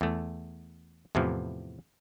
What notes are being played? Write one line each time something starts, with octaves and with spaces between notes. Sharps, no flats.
E2 A3
E2 A2 C3 E3 F3